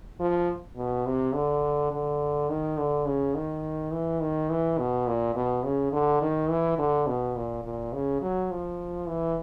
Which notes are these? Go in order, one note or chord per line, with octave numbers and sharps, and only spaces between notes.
F3
B2
C3
D3
D3
D#3
D3
C#3
D#3
E3
D#3
E3
B2
A#2
B2
C#3
D3
D#3
E3
D3
B2
A#2
A#2
C#3
F#3
F3
E3